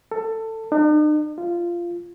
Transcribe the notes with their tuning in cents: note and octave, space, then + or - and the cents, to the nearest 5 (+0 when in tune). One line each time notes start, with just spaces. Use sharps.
A4 +20
D#4 -45
F4 -15